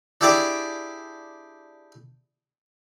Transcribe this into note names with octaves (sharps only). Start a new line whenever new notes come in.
D4 E4 G4 G#4 D5 E5